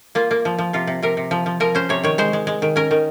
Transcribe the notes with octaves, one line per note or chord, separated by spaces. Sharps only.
A#3 F4
A#3
F3
F3
C3 F4
C3
C3 A#4
C3
F3
F3
F3 A#4
C#4 C5
C3 C#5
D#3 C#5
G#3 C5
G#3
G#3
D#3
C#4 A#4
D#3